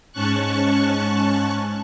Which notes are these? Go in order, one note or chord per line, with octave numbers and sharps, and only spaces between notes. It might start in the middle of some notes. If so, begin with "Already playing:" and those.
G#2 C#4 A5 C#6 F#6